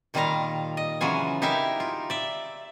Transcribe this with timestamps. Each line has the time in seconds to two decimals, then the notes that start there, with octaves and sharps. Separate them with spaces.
0.14 A#2 D#3 G3 F4 F5 A#5
0.77 D#5
1.01 C#3 E3 F#3 F4 G#5
1.42 D#4 E4 G4 A#4 E5 F5
1.80 F4
2.10 D5 E5